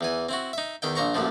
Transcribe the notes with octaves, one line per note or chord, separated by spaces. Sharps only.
E2 E3 G#5
C4 E4 F#4
D#4 E5
E2 D#3 E5 G5
A#1 A#2 C5 A#5 C#6
A1 F#2 A#2 F3